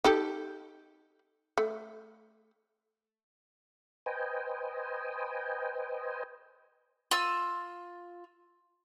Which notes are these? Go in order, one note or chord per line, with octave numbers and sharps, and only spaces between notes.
D#4 G4 A4
A3
B4 C5 D#5 G5 G#5
F4 E6